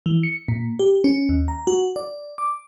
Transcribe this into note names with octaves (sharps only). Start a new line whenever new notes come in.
E3
C#7
A#2
G4
C#4
D#2
A#5
F#4
D5
D6